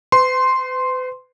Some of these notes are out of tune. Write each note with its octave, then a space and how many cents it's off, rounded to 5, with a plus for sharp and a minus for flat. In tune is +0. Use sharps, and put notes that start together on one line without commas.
B4 +45 C6 +0